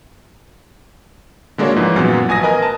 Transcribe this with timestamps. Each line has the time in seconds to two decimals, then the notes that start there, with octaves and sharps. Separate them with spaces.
1.58 D3 G#3 A#3 D4 F#4 C#5
1.76 G#2 E3 F3
1.96 F#2 A#2 F3 F#3 B3
2.29 A1 G#5 D#6 A#6
2.43 A#4 B4 D#5 G#5
2.62 A5